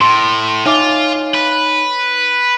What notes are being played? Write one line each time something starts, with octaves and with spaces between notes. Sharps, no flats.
A2 C6
D#4 F4 C#5 E5 G#5 D6
B4